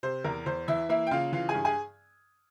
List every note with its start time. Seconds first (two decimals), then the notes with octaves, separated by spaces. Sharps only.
0.03 C3 C5
0.24 E2 A#4
0.46 E2 C5
0.68 E3 E4 E5
0.89 A#3 E4 E5
1.07 G5
1.11 C#3 F4 F5
1.32 E3 F4 F5
1.49 G#4 G#5
1.54 G2
1.65 G#4 G#5